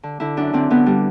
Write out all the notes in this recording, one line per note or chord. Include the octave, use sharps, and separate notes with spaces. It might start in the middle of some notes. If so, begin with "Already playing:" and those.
D3
D3 E4
F#2 D4
D3 C4
D3 B3
G3